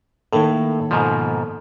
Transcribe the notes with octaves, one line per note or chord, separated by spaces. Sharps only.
A2 D#3 A#3 A4
G#2 B2 F3